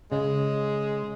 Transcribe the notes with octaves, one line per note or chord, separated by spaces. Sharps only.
C#3 G#3